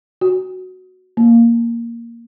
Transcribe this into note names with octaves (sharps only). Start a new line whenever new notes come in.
F#4
A#3